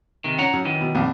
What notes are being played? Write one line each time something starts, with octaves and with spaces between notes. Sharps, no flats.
C3 D#3
C#4 F#5 A#5
F#2
D#3 E3
B2
A#1 F2